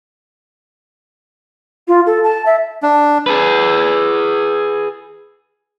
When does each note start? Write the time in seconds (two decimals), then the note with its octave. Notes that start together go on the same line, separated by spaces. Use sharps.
1.87 F4
2.06 A4
2.23 A5
2.45 E5
2.83 D4
3.26 G#4 B4